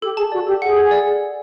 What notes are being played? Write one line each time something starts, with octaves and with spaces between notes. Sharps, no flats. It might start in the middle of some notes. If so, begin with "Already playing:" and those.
G4 A4
G#4 A5
F#4 D5
G4 A4
G#4 F#5
A4
D5